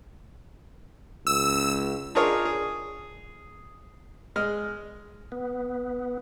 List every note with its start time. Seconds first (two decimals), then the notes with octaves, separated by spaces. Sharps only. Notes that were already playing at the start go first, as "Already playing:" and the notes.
1.27 C#2 E6
2.15 D4 D#4 F4 G#4 A#4 C#5
2.45 G#4
4.36 G#3 F6
5.32 B3